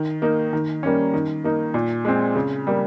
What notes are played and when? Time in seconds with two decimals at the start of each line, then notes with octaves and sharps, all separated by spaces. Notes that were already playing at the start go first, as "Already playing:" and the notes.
Already playing: D#3
0.22 A#3 D#4
0.53 D#3
0.83 G3 A#3 C#4
1.14 D#3
1.44 A#3 D#4
1.74 A#2
2.05 G#3 C4
2.36 C#3
2.67 G3 A#3